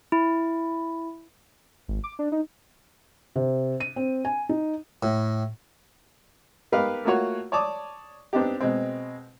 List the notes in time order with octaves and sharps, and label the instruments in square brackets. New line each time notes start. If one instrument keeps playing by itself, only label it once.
[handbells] E4
[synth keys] G#1
D6
D4
D#4
[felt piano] C3
D#7
C4
G#5
D#4
[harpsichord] A2
[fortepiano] B3 D#4 G4 A#4 B4 F5
A3 A#3 F4 F#4 C#5 F#5
C#5 D5 A5 D6 D#6
B3 C4 D4 D#4 G4
B2 G#3 C4